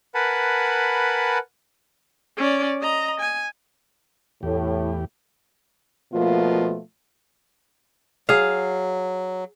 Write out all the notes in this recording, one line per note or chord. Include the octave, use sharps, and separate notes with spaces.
A#4 B4 F#5 G#5 A5 B5
C#4 D5
D#5 A#5
G#5
E2 A2 G4
B2 F3 A3 A#3 F4
F#3 G#4 F5